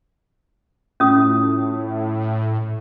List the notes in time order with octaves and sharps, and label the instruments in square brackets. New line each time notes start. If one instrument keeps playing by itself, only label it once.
[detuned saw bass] A2 [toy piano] C#4 F4 D#6